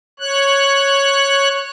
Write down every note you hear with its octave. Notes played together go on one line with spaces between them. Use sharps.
C#5 F#6